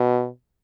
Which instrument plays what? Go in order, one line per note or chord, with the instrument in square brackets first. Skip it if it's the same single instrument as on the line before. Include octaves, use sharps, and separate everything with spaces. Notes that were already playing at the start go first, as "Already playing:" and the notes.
Already playing: [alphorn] B2